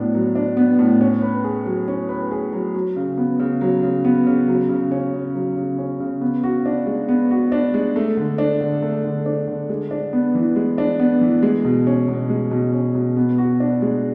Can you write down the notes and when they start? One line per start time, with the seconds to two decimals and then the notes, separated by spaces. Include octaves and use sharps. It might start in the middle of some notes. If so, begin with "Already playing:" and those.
Already playing: A2 F#3 B3 D4
0.14 F#3
0.35 D4
0.57 B3
0.79 A2
1.01 C#4
1.22 B4
1.44 G#4
1.66 F#3
1.88 C#4
2.09 B4
2.31 G#4
2.53 F#3
2.75 F#3
2.96 C#3
3.17 B3
3.40 C#3
3.61 F#3
3.83 C#3
4.05 B3
4.27 C#3
4.48 F#3
4.70 C#3
4.91 C#4
5.13 C#3
5.35 F#3
5.57 C#3
5.78 C#4
6.00 C#3
6.21 B3
6.43 F#4
6.66 D4
6.87 G#3
7.09 B3
7.30 F#4
7.52 D4
7.74 G#3
7.96 A3
8.17 D3
8.38 D4
8.61 D3
8.82 A3
9.04 D3
9.26 D4
9.48 D3
9.69 G#3
9.91 D4
10.13 B3
10.35 E3
10.56 G#3
10.78 D4
10.99 B3
11.21 E3
11.43 G#3
11.65 B2
11.87 C#4
12.08 B2
12.30 G#3
12.51 B2
12.73 C#4
12.95 B2
13.17 B3
13.38 F#4
13.60 D4
13.82 G#3